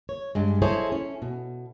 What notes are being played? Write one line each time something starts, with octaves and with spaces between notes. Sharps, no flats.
C#5
G2 G#3
E4 G#4 A4 C5 C#5 D#5
C#4
B2